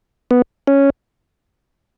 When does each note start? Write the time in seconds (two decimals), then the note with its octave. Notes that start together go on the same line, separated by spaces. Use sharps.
0.31 B3
0.67 C#4